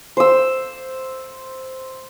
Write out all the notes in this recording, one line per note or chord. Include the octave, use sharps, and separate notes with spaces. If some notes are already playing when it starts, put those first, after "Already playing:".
C5 E6